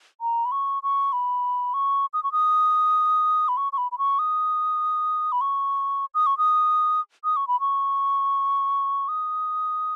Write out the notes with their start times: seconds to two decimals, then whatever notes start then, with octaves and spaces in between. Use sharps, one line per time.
0.21 A#5
0.45 B5
0.52 C#6
0.83 C#6
1.13 B5
1.74 C#6
2.13 D#6
2.23 C#6
2.32 D#6
3.48 B5
3.57 C#6
3.73 C#6
3.78 B5
3.92 B5
3.98 C#6
4.19 D#6
5.32 B5
5.41 C#6
6.14 D#6
6.26 C#6
6.38 D#6
7.24 D#6
7.36 C#6
7.48 B5
7.60 C#6
9.08 D#6